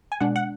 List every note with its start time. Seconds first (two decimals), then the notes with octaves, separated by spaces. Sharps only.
0.12 G#5
0.20 B2 G#3 D4 F#5
0.36 F#5